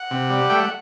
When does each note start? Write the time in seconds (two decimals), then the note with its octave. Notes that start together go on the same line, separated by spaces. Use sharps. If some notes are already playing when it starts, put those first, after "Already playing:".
Already playing: F#5
0.11 C3
0.30 G3
0.50 A3 G5
0.60 F#5